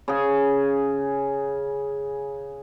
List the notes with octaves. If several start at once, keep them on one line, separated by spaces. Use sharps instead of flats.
C#3 G#4